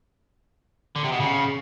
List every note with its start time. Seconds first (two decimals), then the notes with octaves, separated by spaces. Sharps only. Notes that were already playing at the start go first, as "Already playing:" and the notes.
0.96 D3
1.04 C3
1.12 B2
1.20 C#3